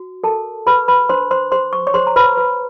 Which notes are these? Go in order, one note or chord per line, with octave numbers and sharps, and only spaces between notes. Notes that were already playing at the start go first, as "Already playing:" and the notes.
Already playing: F#4
A4 A#4 A5
G#4 B4 B5
B4 B5
D4 C5 C6
C5 C6
G#4 C5 C6
C#6
C#5 C#6
G#4 C5 C6
A#5
B4 B5
B4